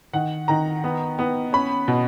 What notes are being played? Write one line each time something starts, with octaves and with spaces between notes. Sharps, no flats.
D#3 F#5
D#3 A#5
B3
B3
C#4 B5
B2